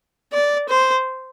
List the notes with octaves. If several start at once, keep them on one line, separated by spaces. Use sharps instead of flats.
D5
C5